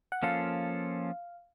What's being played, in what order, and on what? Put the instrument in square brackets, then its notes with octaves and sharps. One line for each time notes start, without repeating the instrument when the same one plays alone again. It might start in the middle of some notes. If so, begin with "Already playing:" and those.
[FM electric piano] F#5
[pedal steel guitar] F3 A#3 C#4 F4 A4 [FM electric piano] F5